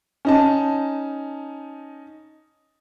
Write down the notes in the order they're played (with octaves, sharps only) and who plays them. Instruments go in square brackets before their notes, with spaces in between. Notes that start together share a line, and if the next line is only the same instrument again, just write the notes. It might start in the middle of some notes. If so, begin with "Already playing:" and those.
[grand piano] C#4 D#4 A5